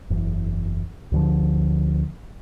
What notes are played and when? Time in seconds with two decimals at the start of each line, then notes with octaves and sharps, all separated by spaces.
0.10 F#1 E2
1.12 D2 D3 F3